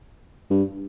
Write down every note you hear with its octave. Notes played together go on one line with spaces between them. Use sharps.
G2